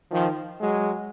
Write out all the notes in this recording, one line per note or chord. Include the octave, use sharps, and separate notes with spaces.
D#3 F3
F#3 G#3